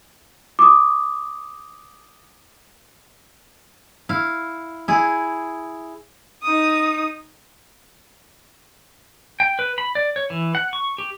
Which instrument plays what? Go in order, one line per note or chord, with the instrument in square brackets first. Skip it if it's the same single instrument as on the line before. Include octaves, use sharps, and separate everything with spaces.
[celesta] D6 D#6
[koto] E4 F5
E4 G#4
[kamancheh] D#4 D#6
[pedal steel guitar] G5
B4
B5
D5
C#5
E3
F#5
C#6
G4